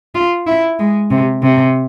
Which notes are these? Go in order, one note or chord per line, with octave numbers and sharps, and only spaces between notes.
F4
E4
G#3
C3
C3